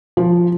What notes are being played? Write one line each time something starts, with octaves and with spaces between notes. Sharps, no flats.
F3